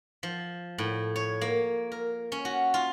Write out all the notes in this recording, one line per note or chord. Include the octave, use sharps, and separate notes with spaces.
F3
A2
C#5
A#3
A#4
C#4
F#4
F4